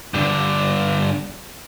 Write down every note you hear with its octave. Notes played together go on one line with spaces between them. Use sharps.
G2 D3